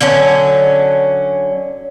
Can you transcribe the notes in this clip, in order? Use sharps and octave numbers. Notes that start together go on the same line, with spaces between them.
D3 F#3 C#4